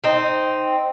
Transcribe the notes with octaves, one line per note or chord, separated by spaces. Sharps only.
C4 D#4